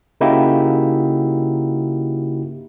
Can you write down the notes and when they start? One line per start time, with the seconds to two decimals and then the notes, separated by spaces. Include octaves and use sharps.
0.21 C#3 A#3 D#4 E4 F#4 G4